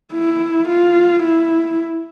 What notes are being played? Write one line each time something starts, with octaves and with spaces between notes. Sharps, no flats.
E4
F4
E4